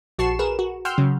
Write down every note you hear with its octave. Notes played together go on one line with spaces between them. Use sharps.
A#1 F#4 A5 C#6 C7 E7
G#4 A#4 B4 E7
F#4
F#5 G5 C6 E6 F6 G6
C#3 F#3